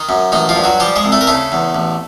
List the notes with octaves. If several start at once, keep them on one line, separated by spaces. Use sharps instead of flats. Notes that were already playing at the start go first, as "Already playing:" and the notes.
Already playing: D#3 D#4
F#2
A1 D#3 D#4
F3 F4
G2
F#3 F#4
F3 G3 G4
G#3 G#4
C2
A3 A4
A#4
C#3 A3 A4
E2
A1